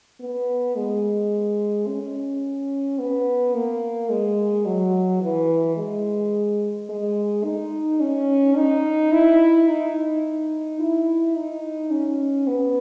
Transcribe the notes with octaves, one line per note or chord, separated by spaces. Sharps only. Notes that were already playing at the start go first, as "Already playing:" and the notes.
B3
G#3
C#4
B3
A#3
G#3
F#3
E3
G#3
G#3
D#4
C#4
D#4
E4
D#4
E4
D#4
C#4
B3